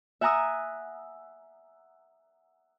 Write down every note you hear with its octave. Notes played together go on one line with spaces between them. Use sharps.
E5 F#5 G#5 A#5 D#6 E6